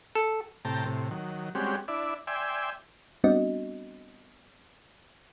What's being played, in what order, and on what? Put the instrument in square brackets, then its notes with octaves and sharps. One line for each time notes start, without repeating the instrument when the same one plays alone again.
[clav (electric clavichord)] A4
[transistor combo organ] A2 C3 G5 A5 A#5
A2 C3
D#3 F#3
G3 G#3 C4 C#4 F#4 G4
D4 E4 D5 E5
D5 E5 G5 G#5 C6 E6
[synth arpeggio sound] G3 B3 C4 D4 F#4 D#5